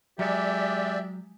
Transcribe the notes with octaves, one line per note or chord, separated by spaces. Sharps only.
F#3 G#3 G4 D5 E5